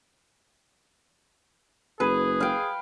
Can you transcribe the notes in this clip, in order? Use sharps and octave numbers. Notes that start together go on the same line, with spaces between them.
F#1 G#4 B4
F5 G5